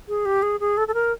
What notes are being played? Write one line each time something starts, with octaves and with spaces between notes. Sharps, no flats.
G#4
G4
G#4
G#4
A4
A4
A#4